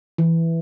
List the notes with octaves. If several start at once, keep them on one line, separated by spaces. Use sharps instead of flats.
E3